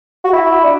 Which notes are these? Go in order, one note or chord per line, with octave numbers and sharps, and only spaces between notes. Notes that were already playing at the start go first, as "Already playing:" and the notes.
F#4
E4
D4